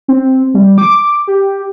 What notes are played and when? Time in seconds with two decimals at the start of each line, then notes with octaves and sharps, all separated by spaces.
0.08 C4
0.54 G3
0.78 D6
1.27 G4